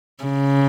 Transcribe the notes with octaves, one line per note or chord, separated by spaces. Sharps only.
C#3